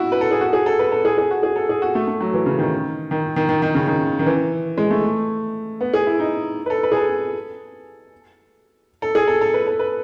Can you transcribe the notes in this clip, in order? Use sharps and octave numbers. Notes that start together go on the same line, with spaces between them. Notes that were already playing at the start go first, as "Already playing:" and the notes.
Already playing: E4 F#4
B4
A4
G#4
F#4
G#4
A4
B4
A4
G#4
G#4
F#4
G#4
A4
G#4
F#4
A3
A3
F#3
E3
C#3
D#3
D#3
D#3
D#3
D#3
C#3
D#3
D#3
E3
G#3
A3
B3
G#4
E4
D#4
B4
A4
B4
G#4
A4
A4
G#4
A4
A4
B4
A4
B4